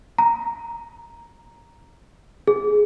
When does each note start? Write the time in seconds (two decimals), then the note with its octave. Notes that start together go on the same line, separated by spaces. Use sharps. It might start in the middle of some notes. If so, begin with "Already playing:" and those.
0.18 A#5
2.48 G#4